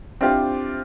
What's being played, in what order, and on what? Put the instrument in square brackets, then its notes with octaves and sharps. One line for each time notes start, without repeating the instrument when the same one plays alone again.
[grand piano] C4 D4 E4 F4 G4 C5